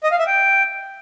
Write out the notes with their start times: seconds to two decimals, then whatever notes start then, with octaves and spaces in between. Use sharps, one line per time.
0.04 D#5
0.11 F5
0.19 E5
0.27 G5